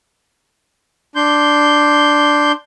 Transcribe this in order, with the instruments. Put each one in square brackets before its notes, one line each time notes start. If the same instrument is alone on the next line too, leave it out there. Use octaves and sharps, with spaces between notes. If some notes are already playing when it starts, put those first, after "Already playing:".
[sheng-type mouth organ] D4 C6 G6